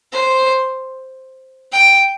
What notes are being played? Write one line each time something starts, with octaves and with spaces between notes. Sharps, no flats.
C5
G5